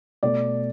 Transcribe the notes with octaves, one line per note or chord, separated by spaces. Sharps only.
B2 A3 D5